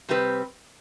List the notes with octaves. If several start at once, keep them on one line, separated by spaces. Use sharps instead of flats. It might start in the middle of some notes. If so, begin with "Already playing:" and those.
C3 G3 C4 G4 B4